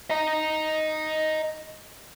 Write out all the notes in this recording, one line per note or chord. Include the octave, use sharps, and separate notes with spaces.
D#5 A#5